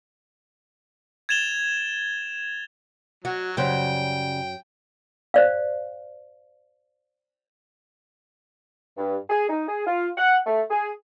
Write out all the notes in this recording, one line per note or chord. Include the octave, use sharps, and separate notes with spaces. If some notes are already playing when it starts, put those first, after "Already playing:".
G#6 A6 E7 F7 G7
F#3 F#4
F#2 C#3 F#3 G3 C5 G5
C5 D5 F5
G2
G#4
D#4
G#4
F4
F#5
A3
G#4